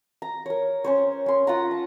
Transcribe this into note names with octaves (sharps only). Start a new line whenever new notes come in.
A#5
A#4 C#5
C#4 C5 C#5
C#4 C6
F4 F#5 A#5
A5